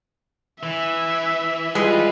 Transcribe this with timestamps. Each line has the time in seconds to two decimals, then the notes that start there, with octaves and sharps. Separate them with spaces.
0.63 E3 E5
1.75 G3 G#3 F4 B4